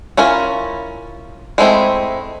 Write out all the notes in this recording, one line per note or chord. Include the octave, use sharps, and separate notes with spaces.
C#4 E4 F4 A#4
G#3 A3 C4 E4